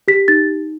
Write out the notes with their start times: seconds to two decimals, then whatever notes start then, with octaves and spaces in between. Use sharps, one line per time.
0.08 G4 B6
0.28 D#4 A6